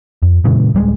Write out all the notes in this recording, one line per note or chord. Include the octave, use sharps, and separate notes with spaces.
F2
A#2 C#3 E3 G#3
D1 G3 G#3